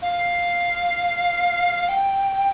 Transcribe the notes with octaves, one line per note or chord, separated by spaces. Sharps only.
F5
G5